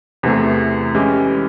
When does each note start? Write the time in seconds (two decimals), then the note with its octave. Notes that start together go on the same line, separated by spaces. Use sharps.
0.23 E2 C3 E3 A3
0.95 E3 G#3 C#4 E4 G4